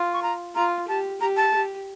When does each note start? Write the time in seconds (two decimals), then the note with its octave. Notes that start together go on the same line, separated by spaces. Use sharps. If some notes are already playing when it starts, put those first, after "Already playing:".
Already playing: F4
0.13 C#6
0.23 A#5
0.55 F4 A#5
0.88 G4 A5
1.21 G4 A#5
1.37 A5
1.54 G4